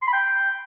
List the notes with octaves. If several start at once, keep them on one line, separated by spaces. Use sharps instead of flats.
C6
B5
G5